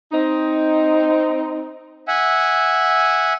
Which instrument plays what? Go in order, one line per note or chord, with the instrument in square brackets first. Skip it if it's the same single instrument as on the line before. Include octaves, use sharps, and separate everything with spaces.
[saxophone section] C4 D#4
[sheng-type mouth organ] E5 F#5 G#5